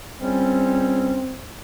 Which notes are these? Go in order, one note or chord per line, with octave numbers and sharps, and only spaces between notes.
C#2 G3 C4 C#4